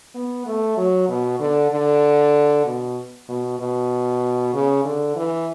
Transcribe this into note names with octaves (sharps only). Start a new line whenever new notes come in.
B3
A3
F#3
B2
D3
D3
B2
B2
B2
C#3
D3
E3